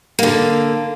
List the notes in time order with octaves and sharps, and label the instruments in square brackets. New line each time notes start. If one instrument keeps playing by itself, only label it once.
[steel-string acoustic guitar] D3 A#3